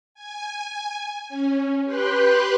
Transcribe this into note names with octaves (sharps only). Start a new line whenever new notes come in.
G#5
C#4
G4 B4 G5 C6 F#6